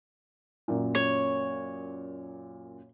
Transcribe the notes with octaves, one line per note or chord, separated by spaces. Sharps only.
F#2 A#2
C#5